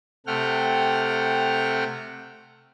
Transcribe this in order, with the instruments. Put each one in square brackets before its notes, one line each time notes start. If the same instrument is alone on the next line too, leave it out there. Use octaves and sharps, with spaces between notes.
[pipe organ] C3 A3 F#5 G5 F6